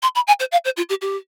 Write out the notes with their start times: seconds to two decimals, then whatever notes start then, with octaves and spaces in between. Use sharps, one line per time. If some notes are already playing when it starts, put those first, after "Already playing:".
0.02 C6
0.15 B5
0.27 G#5
0.40 C5
0.52 F5
0.65 C5
0.77 F4
0.89 G4
1.01 G4